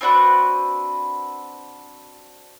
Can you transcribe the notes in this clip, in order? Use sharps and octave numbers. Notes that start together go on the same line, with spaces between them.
C4 D4 F#4 B4